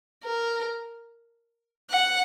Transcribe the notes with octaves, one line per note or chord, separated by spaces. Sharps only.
A#4
F#5